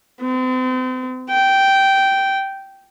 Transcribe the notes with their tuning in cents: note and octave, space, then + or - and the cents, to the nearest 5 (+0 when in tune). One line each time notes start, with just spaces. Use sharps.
C4 -40
G5 -10